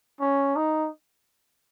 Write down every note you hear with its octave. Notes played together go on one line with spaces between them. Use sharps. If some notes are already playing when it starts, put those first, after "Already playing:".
C#4
D#4